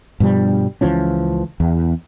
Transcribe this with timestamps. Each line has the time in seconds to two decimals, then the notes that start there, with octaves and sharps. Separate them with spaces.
0.20 G2 B2 F3 G3
0.81 C#2 E3 F3 C#4
1.60 E2